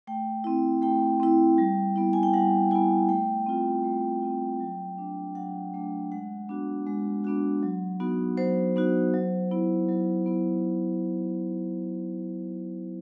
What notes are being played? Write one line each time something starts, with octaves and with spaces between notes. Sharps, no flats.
A3 G5
C4 E4
A3 G5
C4 E4
G3
B3 E4
G#5
G5
G3 F#5
B3 E4 G#5
A3 G5
C4 F4
A3
C4 F4
F#3
A3 D4
F#3 F#5
A3 D4
G#3 F#5
B3 D4 F#4
G#3
B3 D4 F#4
F#3
B3 D#4 F#4
F#3 C5
B3 D#4 F#4
F#3
B3 E4
F#3
B3 E4